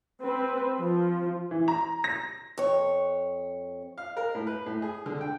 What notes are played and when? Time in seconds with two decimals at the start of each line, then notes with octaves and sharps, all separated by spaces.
0.22 C4 B4
0.80 F3
1.51 E3
1.68 A#5
2.04 A#6
2.58 F2 C#5
3.98 F5
4.17 A#4
4.35 A2
4.47 B4
4.66 A2
4.82 G#4
5.06 D3
5.21 G5